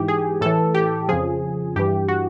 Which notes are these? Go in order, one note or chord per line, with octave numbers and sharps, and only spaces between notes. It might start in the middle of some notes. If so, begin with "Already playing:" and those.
Already playing: G#2 E3 G4
G#4
A2 E3 A4
G4
F2 C#3 F3 G#4
G2 E3 G4
F#4